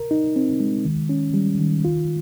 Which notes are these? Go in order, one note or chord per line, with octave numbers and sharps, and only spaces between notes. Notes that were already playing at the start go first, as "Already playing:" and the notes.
Already playing: A#4
D#4
C4
G#3
D#3
C#4
G3
D#3
F4